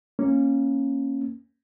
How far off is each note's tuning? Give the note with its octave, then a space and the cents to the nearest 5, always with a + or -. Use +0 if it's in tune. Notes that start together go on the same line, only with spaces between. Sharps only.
A#3 +0 C#4 -15